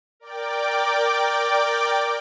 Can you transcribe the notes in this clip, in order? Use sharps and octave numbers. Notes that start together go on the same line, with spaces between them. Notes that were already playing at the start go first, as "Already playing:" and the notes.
A#4 D5 G5 D6